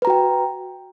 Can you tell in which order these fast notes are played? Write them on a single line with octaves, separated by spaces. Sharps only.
B4 A#5 F#4 G5